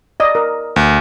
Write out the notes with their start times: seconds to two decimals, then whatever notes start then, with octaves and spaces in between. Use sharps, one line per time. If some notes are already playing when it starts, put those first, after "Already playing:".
0.20 D5 D#5
0.35 A#4
0.76 D2